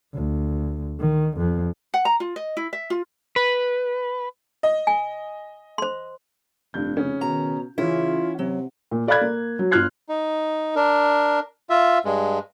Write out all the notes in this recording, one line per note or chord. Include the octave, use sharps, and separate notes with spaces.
D2
D#3
F2
F#5
A#5
F4
D#5
E4
E5
F4
B4
D#5
G#5
C5 C6
F1 G2 G6
C#3 C#4
B2 D#3 A#5
C#3 E3 C#4 E4 F4
C3 F#3
A#2
A4 D5 F5 B5 F#6 G#6
A#3
F#3
G1 F4 F6 F#6 G#6 C7
D#4
D4 A#4
F4 E5
G2 G#3